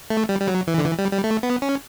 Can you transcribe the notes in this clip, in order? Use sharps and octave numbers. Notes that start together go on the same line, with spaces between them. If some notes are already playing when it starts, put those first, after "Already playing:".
A3
G3
G3
F#3
E3
D3
E3
G3
G3
A3
B3
C#4